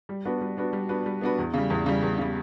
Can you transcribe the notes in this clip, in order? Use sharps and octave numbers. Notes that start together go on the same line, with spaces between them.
G3
B3 D4 F#4 B4
G3
B3 D4 F#4 B4
G3
B3 D4 F#4 B4
G3
B3 D4 F#4 B4
E2
C#3 G3
E2
C#3 G3
E2
C#3 G3